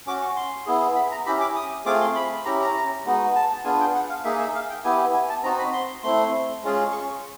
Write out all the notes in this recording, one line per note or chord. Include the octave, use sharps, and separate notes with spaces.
C#4 F#4 D6
C#6
C6
B3 E4 G#4
B5
A#5
C#4 E4 G4 B5
D6
D#6
A3 C4 F4 G#4 D6
C6
B5
C#4 E4 G4 A#5
A#5
G#3 B3 D#4 F#4
A5
B3 D4 F4 G#4 G#5
G5
F#5
F5
A#3 D#4 G#4 E5
E5
F5
G5
B3 E4 G4 G#5
G#5
A5
C4 D#4 F#4 A#5
B5
C6
A3 C4 E4 C6
G#3 C#4 F4 G#4
C#6